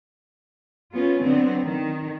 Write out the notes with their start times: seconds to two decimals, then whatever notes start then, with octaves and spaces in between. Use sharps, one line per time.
0.92 B3 C#4 F4
1.21 D3 F#3 B3 C4
1.63 D#3